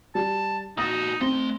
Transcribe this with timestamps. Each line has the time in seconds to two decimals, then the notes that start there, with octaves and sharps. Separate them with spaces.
0.15 G3 A5
0.78 A#2 D#4 F#4 D#6
1.21 A3 C4 C6